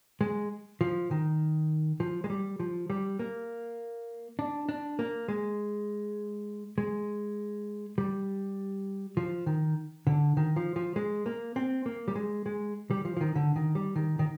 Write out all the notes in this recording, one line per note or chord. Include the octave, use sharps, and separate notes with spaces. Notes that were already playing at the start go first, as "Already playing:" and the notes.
G#3
F3
D#3
F3
G#3
G3
F3
G3
A#3
D4
D4
A#3
G#3
G#3
G3
F3
D#3
D3
D#3
F3
F3
G#3
A#3
C4
A#3
G3
G#3
G#3
G3
F3
F3
D#3
D3
D#3
G3
D#3
D#3